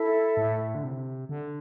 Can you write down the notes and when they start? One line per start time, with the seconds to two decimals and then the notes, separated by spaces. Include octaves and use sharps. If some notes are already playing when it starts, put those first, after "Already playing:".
Already playing: E4 A4 E5
0.37 A2
0.75 D3
0.83 C3
1.29 D3